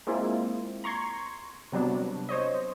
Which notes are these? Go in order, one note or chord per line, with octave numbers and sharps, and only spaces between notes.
G#3 A#3 C4 E4 F4
A#5 C6 C#6 G#6
C3 F#3 G3 B3 D4
C5 C#5 D#5